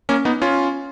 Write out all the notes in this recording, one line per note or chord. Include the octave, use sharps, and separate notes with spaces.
A#3 C#4
B3 D#4
C#4 F4